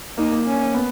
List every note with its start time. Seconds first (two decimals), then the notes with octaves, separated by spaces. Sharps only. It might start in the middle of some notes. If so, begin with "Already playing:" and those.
0.18 A#3 D#4
0.32 A#3
0.46 C#4
0.74 B3